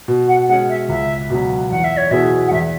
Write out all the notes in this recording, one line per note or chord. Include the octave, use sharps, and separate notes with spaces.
B2
F#5
G#3 C#4 F#5
E5
C#2 E5
B2 F#3
E2 F#5
E5
C#5
B2 B3 E4 G#4 E5
F#5
E2 E5